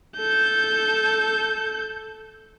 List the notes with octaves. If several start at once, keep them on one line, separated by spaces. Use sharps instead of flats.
A4 G6